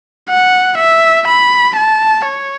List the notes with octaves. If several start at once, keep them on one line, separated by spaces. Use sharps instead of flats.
F#5
E5
B5
A5
C#5